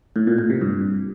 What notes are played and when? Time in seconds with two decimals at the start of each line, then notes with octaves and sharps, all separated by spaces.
0.16 A2
0.27 A#2
0.38 A2
0.50 C3
0.61 G2